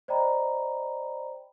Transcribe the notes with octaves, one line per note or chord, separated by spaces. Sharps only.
C5 D5 D#5 G5 A#5 B5